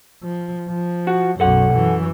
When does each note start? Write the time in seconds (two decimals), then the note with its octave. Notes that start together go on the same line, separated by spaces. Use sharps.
0.23 F3
0.69 F3
1.07 F#4
1.40 B1 F#2 A4 F#5
1.73 F#2 E3